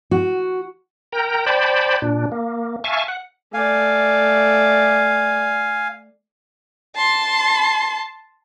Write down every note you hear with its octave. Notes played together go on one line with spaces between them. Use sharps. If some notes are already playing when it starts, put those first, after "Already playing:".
F#4
A#4 G5 A#5
C5 D5 G5 A5 B5
A#2 D4
A#3
E5 F5 G#5 A5 C#6
F#5
A3 D5 F5 G#5
A5 C6